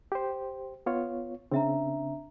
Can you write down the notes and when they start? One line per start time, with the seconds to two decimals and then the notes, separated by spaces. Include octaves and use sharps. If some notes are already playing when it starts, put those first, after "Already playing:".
0.12 G4 C5
0.86 B3 F4 C#5
1.51 C#3 C4 D4 E5 A#5